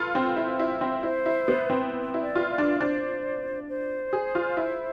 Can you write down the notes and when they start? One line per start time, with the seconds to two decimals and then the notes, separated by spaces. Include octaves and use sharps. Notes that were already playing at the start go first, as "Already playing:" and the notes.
Already playing: F4 A4 B4
0.15 C4 C5
0.36 E4
0.59 E4
0.81 C4
1.02 E4 C5
1.26 E4
1.48 B3
1.70 C4
2.14 E4
2.21 D5
2.35 F4
2.50 D5
2.58 D4
2.80 D4 C5
3.69 C5
4.13 G#4
4.35 F4
4.57 E4